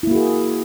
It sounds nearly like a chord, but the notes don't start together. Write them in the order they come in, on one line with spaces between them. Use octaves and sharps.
E4 A#3 F#4 G#4